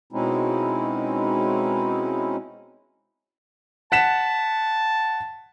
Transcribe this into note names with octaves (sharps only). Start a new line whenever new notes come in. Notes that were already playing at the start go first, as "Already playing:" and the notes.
B2 G#3 C4 C#4 D#4 E4
F#5 A5 B6 E7